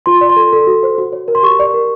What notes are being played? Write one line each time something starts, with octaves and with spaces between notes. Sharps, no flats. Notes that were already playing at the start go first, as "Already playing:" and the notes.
F4 C6
D5
C6
A4
A4
F#4
C5
F#4
C#5
A#4
C6
G4 C#6
D5
A#4